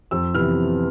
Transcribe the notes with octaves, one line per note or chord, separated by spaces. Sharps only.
F2 E6
C3 E3 B3 F6